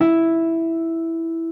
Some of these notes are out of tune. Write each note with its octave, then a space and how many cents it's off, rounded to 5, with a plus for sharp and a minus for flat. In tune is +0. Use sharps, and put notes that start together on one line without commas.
E4 +0